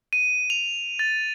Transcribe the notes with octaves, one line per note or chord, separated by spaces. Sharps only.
D#7
F7
A6